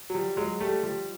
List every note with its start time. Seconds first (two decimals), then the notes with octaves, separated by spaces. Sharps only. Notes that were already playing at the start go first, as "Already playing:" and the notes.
0.10 F#3
0.14 F3 G3
0.37 F#3 G#3
0.60 G3 A3
0.83 F3 G3